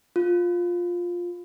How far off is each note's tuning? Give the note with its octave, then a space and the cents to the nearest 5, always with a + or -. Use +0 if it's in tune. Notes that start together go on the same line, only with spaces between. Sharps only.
F4 +10